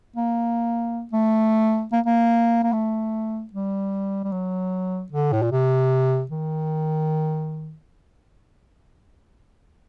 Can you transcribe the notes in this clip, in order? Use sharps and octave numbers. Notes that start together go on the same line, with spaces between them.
A#3
A3
A#3
A#3
A#3
A3
G3
G3
F#3
D3
A2
A#2
C3
D#3